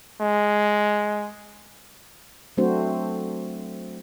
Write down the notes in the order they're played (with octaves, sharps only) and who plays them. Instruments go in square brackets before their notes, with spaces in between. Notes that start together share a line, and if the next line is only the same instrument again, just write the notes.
[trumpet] G#3
[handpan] F#3 A3 C4 D4 F#4 C5